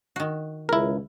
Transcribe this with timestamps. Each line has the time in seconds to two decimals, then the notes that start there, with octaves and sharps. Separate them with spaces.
0.16 D#3 F#4
0.69 C#2 E4 A#4